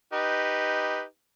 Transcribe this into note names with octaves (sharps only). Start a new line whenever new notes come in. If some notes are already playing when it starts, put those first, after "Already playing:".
D#4 G4 B4